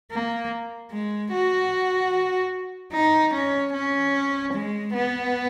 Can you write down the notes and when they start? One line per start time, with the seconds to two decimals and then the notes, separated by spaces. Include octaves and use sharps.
0.11 A#3
0.92 G#3
1.32 F#4
2.92 D#4
3.34 C#4
3.73 C#4
4.53 G#3
4.94 B3